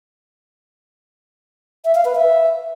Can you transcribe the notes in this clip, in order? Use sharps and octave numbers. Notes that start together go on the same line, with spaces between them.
E5
F5
B4
E5